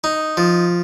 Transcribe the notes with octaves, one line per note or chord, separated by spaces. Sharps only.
D#4
F3